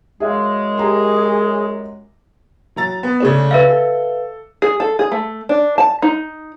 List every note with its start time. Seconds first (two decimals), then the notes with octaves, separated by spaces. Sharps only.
0.20 F#2 G#3 G#4 E5 F5
0.77 G4 G#4 A#5 C6
2.76 F#3 A#5 A6
3.03 B3
3.20 C#3 A3 D4
3.51 B4 E5 F5
3.68 A4
4.62 G#4
4.80 A4
4.99 G#4
5.12 A3
5.49 D4
5.78 A5
6.02 D#4